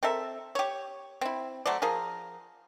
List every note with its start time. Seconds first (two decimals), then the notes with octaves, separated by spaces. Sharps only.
0.03 C4 A4 A#4 E5
0.55 G4 C#5
1.21 C4 E4
1.66 F#3 A3 C5 D5
1.82 F3 G#4 A#4